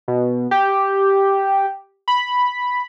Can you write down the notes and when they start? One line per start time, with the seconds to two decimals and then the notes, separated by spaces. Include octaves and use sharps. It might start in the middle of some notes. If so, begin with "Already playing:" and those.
0.08 B2
0.51 G4
2.08 B5